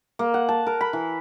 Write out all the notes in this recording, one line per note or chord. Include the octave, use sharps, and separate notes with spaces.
A#3
F#5
A5
A#4
B5
E3